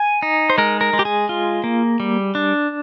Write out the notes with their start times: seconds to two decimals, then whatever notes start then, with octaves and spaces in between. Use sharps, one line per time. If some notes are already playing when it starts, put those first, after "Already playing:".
Already playing: G#5
0.22 D#4
0.50 C5
0.58 G#3 A#4
0.81 A#4
0.93 G#3
0.99 G4
1.05 G#4
1.29 F4
1.64 A#3
2.00 G3
2.35 D4